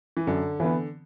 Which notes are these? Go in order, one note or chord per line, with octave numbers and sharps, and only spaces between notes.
E3
F#2 D3
E3 B3